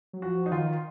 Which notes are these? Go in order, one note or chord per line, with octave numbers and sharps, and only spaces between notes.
F#3
F3 F#4
D#4
D#3 F4